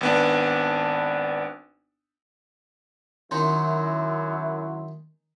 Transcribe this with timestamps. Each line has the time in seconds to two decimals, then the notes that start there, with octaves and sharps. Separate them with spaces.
0.01 G#1 B3 D4
3.31 F#2 D#3 F#3 C#4 D#4 E4 C6